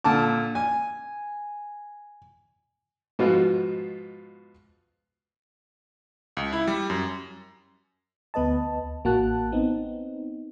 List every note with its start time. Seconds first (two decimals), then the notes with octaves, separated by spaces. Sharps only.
0.04 A#2 D3 A5 D6
0.55 G#5
3.19 G#2 B2 F3 B3 F4 F#4
6.37 C#2
6.53 E4
6.67 G3
6.90 F#2
8.34 D2 B3 B4 D#5 A5
9.04 A1 A#3 F#4 A5 F#6
9.52 B3 C4 D#4